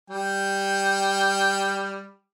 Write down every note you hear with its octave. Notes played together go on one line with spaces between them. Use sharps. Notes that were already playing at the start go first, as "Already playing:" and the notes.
G3 G5